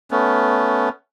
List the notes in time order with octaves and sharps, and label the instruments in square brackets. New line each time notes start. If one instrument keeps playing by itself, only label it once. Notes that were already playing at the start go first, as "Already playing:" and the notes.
[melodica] A3 B3 C#4